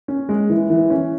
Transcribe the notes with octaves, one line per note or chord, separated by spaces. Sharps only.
C#4
G#3
E3
E3
C#4